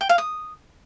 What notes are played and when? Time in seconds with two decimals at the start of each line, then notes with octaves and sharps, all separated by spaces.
0.01 G5
0.09 F5
0.18 D#6